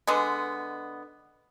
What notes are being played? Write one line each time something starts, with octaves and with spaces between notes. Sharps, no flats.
D3 G#3 B3